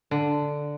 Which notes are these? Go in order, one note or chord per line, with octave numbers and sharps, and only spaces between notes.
D3